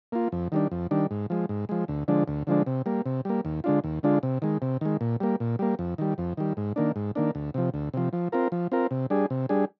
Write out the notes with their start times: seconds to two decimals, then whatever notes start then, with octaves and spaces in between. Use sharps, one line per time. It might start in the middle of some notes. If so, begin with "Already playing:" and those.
0.12 A#3 F4
0.32 F2
0.52 D#3 G3 D4
0.72 F2
0.91 D#3 G3 D4
1.11 G#2
1.30 F3 G#3
1.49 G#2
1.69 F3 G#3
1.88 D2
2.08 D3 F3 G#3 D4
2.28 D2
2.47 D3 F3 G#3 D4
2.66 C3
2.86 G3 A#3
3.06 C3
3.25 G3 A#3
3.45 D#2
3.64 D3 G#3 D4 F4
3.84 D#2
4.03 D3 G#3 D4 F4
4.23 C3
4.42 D#3 G#3
4.62 C3
4.81 D#3 G#3
5.01 A#2
5.20 G3 A#3
5.40 A#2
5.59 G3 A#3
5.79 F2
5.98 D#3 G3
6.18 F2
6.37 D#3 G3
6.57 G#2
6.76 D#3 A#3 D4
6.96 G#2
7.15 D#3 A#3 D4
7.35 D2
7.54 C3 F3
7.74 D2
7.94 C3 F3
8.13 F3
8.32 C4 F4 A#4
8.52 F3
8.72 C4 F4 A#4
8.91 C3
9.10 G3 D4 G#4
9.30 C3
9.49 G3 D4 G#4